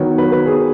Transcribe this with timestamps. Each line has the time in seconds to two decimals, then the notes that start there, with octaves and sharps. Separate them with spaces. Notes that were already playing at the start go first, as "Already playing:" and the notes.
Already playing: D#3 F#3 B3 C#5
0.18 B4
0.32 B4
0.46 G#4